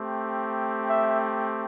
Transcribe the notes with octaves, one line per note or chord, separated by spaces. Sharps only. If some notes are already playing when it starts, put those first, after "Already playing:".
Already playing: A3 C4 G4
E5